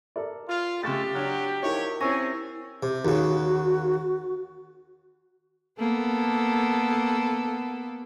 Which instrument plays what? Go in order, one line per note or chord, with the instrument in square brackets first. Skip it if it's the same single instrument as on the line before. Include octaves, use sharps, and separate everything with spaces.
[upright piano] A4 A#4 D5
[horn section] F4
[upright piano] C#3 C#6 A6 [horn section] G#3 A3 A4 [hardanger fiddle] G4
[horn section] F#3 [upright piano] D4 F6
[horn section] F3 C#5 [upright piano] D#4 F#4 G#4 [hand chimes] E4 A#4
[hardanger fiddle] C4 C#4 [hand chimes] E4 E6 A#6 [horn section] C#5 G#5 [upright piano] C#6
[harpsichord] C3
[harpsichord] D#2 C#3 [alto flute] F#4
[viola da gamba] A#3 B3 A4